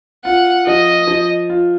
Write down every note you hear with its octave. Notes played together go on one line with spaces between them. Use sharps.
F4 F#5
F3 D#5
F3
F4